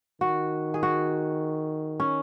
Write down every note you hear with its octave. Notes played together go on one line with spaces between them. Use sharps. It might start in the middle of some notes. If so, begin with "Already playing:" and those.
D#3 F#4
G#4
F#4
C#4